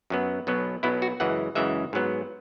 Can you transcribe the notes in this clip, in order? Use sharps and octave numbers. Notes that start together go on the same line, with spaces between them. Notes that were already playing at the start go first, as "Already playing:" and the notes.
F#2 F#3 B3
B1 B2 F#3 B3
B1 B2 F#3 B3 E4
F#4
F#2 C#3 E3 G#3 F#5
F#2 C#3 E3 G#3 E5
G#2 F#3 B3